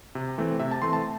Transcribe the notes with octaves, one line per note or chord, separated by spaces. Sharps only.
C3
E3 A3 C4
C3 E5
A5
E3 A3 C4 C6
A5